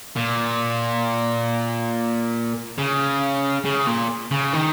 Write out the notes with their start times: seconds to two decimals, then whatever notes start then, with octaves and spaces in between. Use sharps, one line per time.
0.16 A#2
2.78 C#3
3.65 C#3
3.87 A#2
4.31 C#3
4.53 D#3